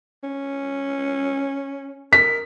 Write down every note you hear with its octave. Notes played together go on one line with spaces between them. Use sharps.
C#4
A#4 B6